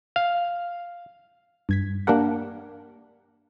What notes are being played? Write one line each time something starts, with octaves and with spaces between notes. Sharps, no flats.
F5
G2 G#6 B6
A#3 D4 G4 A#4 F#5